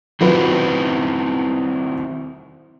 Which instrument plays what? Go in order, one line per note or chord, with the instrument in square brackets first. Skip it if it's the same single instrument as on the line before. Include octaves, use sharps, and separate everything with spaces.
[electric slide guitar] D#3 C4 E4 [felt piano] F#3 F4 B4